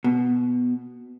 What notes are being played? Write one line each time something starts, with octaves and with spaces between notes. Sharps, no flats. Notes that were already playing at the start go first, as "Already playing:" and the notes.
B2